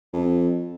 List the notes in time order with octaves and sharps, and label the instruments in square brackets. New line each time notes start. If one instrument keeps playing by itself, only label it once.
[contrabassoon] F2